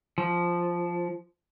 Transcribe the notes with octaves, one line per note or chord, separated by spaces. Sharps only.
F3